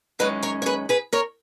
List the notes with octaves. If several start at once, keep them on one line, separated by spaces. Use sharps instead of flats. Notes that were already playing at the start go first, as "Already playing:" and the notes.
F#2 D#3 G#3 C#4 B4 D#5
A#4 C#5
C#5
G#4 B4
G#4 B4
A#4 C#5